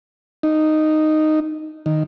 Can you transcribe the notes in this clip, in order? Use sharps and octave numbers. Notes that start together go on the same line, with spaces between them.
D#4
D#3